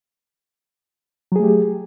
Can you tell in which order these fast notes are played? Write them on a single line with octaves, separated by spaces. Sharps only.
F#3 G#4 A3 G4